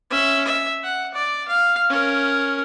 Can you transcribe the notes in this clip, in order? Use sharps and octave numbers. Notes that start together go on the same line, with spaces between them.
C#4 E5
E5
F#5
D5
F5
C#4 A#4